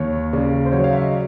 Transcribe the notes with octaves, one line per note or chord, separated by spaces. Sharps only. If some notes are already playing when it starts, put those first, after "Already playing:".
Already playing: D#2 C#5
C#3 D5
C5
F#3 C#5
F5
E5
D#5
D5